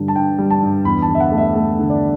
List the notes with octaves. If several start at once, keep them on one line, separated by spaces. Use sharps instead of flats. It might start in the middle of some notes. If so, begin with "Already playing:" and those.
Already playing: G2 D3 G3
A5
G2 G5
G3
A5
G2
E2 B5
A5
D3
E5
F#5
A3
E5
A3
D3
D5